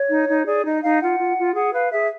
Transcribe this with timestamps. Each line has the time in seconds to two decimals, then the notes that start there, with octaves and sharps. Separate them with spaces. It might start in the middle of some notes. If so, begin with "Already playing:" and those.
Already playing: C#5
0.10 D#4
0.28 D#4
0.46 G#4 D5
0.65 D#4 D#5
0.82 D#4 F5
1.02 F4 F#5
1.19 F4
1.38 F4
1.55 G#4 F#5
1.73 B4 F5
1.91 G#4 E5